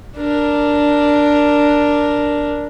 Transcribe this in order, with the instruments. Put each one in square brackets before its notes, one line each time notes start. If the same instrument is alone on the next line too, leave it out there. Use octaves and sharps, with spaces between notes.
[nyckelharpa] D4 A#4